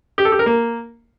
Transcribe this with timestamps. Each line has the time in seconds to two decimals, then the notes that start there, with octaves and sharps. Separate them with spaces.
0.18 G4
0.25 A4
0.32 G4
0.39 A#4
0.46 A#3